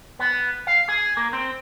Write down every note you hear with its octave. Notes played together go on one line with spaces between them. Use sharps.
B3
F5
G#4
A#3
C4